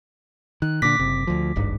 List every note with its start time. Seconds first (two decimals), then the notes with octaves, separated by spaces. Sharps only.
0.62 D#3 F#6
0.82 A#2 D3 D6 A#6 B6
0.99 F#1 C3
1.27 D2 F3
1.56 D1 G#1 G2